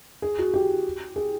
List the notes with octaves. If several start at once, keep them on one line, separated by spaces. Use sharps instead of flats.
G#4
F#4
G4
G#4